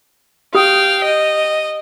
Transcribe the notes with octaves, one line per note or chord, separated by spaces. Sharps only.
G4 F5 G5 D#6
D#5